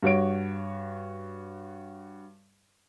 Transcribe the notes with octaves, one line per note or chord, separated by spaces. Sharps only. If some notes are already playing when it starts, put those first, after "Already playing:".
G2 F#4 C#5 D7